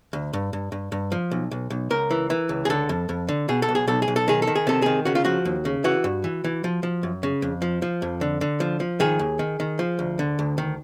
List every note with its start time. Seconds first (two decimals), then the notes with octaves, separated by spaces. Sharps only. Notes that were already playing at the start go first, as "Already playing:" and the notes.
0.13 D2
0.33 G2
0.53 G2
0.72 G2
0.92 G2
1.12 F3
1.31 B1
1.51 B1
1.70 B1
1.90 C#2 A#4
2.11 E3
2.30 E3
2.49 C#2
2.65 G#4
2.70 D3 A4
2.89 F2
3.09 F2
3.29 D3
3.49 B2 G#4
3.62 A4
3.69 B1
3.75 G#4
3.88 B1 A4
4.02 G#4
4.08 B1
4.16 A4
4.28 D#3 G#4
4.42 A4
4.47 D#3
4.55 G#4
4.67 C3 A4
4.82 D#3 G#4
5.05 C#3 F#4
5.15 F4
5.25 F3 F#4
5.45 D#2
5.65 C#3
5.84 E3 F#4
6.04 G2
6.24 E3
6.44 E3
6.64 F3
6.83 F3
7.03 F#2
7.23 C#3
7.42 F2
7.62 F3
7.82 F3
8.02 F2
8.21 D3
8.41 D3
8.60 F3
8.80 F3
9.00 D#3 G#4
9.19 D#2
9.39 D#3
9.60 D#3
9.79 F3
9.99 D2
10.19 D3
10.39 D2
10.58 D#3